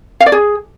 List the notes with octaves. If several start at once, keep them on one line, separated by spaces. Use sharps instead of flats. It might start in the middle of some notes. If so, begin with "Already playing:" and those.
F5
D5
G#4